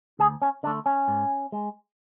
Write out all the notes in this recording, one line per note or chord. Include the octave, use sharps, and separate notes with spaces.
D2 G#4
C#4
D3 A3 D4
C#4
G#2
G#3